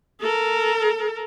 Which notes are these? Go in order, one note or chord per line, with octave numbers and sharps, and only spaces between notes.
A4 A#4